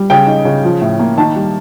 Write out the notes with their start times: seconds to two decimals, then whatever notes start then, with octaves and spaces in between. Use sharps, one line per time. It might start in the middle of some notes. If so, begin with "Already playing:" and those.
Already playing: G3
0.10 C#3 G5
0.27 D#4
0.45 C#3
0.64 F3
0.82 A2
0.99 A#3
1.17 D#3 A5
1.36 G3